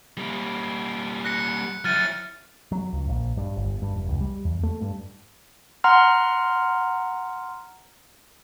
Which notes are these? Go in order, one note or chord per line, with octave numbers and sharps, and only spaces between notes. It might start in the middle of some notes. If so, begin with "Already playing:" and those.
G3 A#3
F#6 A#6 C#7
F#3 E4 F6 A6 D#7
F#3
C#2
A#1
G2
G1
G2
F1
C#2
G3
E2
A3
G2
F#5 A#5 C6 F6